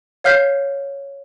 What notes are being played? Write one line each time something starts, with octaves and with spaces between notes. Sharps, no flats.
C#5 F5 F6 G6 B6 C7